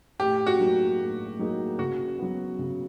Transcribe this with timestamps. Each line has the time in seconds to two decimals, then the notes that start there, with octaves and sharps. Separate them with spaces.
0.19 A2 G4
0.47 F#4
0.59 F#3 A#3 D#4 G#4
0.99 A2
1.39 F#3 A#3 D#4 G#4
1.79 C#3 F#4
2.19 F#3 B3
2.59 C#3